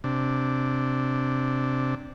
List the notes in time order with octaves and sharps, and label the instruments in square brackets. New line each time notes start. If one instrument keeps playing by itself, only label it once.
[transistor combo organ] C3 D4